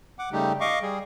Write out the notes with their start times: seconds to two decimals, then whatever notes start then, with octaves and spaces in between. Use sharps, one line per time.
0.19 F#5 D6
0.32 C#3 G3 A3 D#4 G4
0.61 D#5 F5 C#6 D6
0.82 G3 G#4